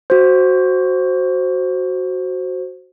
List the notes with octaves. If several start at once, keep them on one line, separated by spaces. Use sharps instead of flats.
F#4 C5